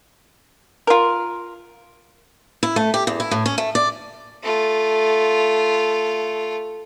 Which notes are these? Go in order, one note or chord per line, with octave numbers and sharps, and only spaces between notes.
F4 A#4
E4
A3
G4
E2
E4
A2
C#4
A3
D5
A3 F4